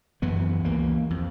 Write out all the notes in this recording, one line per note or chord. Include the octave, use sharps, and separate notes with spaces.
F#2 E3 B3
C#2 E3 A#3
F2